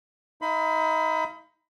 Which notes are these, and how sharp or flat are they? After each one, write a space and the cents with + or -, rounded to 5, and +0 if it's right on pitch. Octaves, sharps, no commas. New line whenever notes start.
D#4 +30 F5 -30 B5 +30